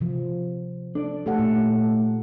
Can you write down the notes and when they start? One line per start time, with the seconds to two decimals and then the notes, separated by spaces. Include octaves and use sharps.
0.01 C3 F3
0.95 D4 A4 D5
1.26 A3 G4 A4 F#5
1.38 A#2 D#4